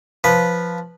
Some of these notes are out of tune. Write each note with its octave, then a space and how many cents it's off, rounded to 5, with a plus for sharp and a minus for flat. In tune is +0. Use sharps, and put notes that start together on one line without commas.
F3 +0 B4 -5